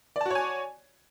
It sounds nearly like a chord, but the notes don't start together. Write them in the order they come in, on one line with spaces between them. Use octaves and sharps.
D5 A5 F#4 C#5 G#5